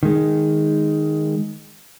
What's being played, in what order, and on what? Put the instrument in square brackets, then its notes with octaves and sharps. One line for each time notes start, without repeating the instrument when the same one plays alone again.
[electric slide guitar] D#3 G#3